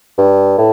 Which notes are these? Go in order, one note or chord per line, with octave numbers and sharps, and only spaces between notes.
G2
A2